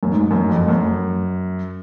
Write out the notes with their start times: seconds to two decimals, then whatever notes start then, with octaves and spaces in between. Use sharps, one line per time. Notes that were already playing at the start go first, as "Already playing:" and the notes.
0.03 F#2
0.12 G#2
0.31 F#2
0.50 F2
0.68 F#2